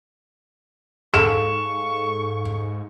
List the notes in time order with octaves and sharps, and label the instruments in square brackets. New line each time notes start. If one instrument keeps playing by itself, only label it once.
[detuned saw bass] G#2 [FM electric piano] G#4 A4 F5 [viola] C#6 [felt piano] E7